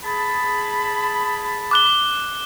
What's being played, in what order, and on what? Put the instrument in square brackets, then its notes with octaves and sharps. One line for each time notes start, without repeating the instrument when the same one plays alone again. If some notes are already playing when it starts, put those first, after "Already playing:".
[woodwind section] G#4 A5 B5
[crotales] D6 F#6 G7